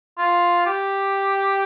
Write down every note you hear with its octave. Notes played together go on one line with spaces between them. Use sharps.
F4
G4